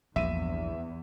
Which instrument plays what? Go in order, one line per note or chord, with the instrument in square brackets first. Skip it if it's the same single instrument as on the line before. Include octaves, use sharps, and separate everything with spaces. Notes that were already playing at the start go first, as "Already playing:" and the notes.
[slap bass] A#1 G2 [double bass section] E2 [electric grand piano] E5 D#7